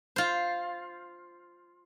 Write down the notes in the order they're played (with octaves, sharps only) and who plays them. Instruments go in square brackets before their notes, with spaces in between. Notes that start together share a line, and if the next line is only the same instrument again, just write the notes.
[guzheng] F4 C5